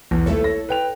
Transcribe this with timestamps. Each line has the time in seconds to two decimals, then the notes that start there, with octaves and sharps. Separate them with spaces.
0.11 B1 E2
0.26 D#1 A3 E4 A4 C#5
0.44 A#6
0.69 B4 G5 F7